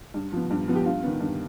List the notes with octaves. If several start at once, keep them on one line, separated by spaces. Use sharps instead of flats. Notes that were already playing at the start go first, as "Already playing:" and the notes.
G2
F3 B3
G2
F3 B3
G4
G2 F4
D#3 B3
G2